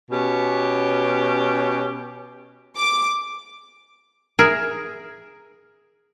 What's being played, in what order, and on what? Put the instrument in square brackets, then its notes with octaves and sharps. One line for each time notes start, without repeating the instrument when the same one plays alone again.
[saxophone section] B2 C#4 G4
[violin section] D6
[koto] G#4 A#4 E5